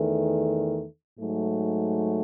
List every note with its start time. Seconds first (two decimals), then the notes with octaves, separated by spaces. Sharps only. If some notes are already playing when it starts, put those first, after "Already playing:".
Already playing: E2 D#3 A3
1.18 G#2 F#3 A3